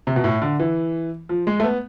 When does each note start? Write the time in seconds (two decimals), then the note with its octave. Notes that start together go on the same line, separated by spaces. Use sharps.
0.07 C3
0.16 B2
0.24 A2
0.42 D3
0.59 E3
1.29 F3
1.47 G#3
1.60 A3
1.64 B3